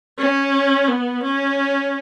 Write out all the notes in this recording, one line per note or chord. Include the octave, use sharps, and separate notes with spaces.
C#4
B3
C#4